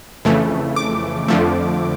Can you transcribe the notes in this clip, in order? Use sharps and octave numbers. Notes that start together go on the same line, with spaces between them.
F2 C#3 E3 A3
D6
F2 D3 F3 A3